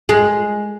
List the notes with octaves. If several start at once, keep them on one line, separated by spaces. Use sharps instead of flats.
G#3